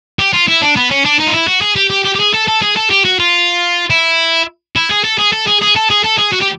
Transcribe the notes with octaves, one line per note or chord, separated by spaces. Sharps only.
G4
F4
E4
D4
B3
C#4
D4
D#4
F4
E4
F#4
G#4
G4
G4
G4
G4
G#4
A4
A4
G#4
A4
G4
F#4
F4
E4
E4
G#4
A4
G#4
A4
G#4
G#4
A4
G#4
A4
G#4
F#4
G4